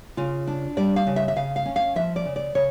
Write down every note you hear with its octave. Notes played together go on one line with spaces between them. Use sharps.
C#3 F4
D4
G3 D5
F5
C#3
E5
E5
C#3 F5
F5
C#4
F5
F3 E5
D5
C#3
D5
C#3 C#5